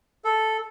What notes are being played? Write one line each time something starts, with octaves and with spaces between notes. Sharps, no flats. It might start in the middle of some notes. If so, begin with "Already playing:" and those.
A4